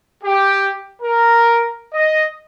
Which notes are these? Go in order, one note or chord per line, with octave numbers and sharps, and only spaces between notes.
G4
A#4
D#5